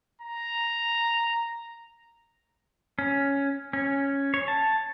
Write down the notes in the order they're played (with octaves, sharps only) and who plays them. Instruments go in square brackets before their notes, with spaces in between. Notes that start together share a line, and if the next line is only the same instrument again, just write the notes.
[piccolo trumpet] A#5
[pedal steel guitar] C#4
C#4
C#5
A5